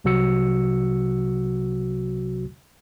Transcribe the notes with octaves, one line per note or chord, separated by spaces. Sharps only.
C2 C3 F#3 F#4 E6 C#7